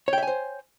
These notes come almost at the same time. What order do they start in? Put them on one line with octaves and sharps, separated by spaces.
C#5 G5 E5 G#5 C5